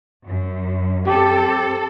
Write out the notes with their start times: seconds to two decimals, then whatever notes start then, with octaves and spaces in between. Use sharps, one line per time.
0.25 F#2
1.07 C4 G4 A4